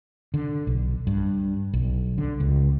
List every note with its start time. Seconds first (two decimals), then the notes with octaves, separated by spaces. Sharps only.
0.34 D3
0.67 B1
1.07 G2
1.73 B1
2.18 D3
2.40 C#2